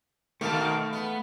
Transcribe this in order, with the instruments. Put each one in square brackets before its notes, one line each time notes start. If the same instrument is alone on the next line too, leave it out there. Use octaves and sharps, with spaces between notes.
[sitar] B2 D#3 A#3 [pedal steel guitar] A3 F5 A5
[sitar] B3